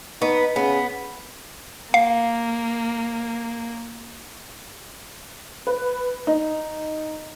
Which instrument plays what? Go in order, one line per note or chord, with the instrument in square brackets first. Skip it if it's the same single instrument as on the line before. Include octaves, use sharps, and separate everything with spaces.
[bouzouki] B3 [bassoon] D#4
[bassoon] C#3 [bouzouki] B3
[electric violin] A#3 [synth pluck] F5
[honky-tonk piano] B4
D#4